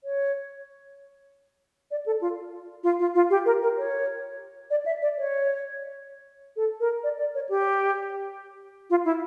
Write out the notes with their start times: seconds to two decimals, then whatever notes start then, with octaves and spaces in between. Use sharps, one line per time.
0.04 C#5
1.91 D5
2.06 A4
2.21 F4
2.84 F4
2.99 F4
3.15 F4
3.30 G4
3.46 A#4
3.62 A#4
3.78 C#5
4.71 D5
4.86 E5
5.02 D5
5.18 C#5
6.56 A4
6.80 A#4
7.04 D5
7.18 D5
7.35 C#5
7.49 G4
8.90 F4
9.05 E4